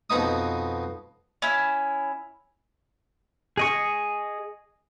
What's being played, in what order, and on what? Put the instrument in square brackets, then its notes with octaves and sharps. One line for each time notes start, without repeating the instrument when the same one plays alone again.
[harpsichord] F2 B2 B3 D#4 D#6
[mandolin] C#4 E4
[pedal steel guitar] G#4 D#5 C#6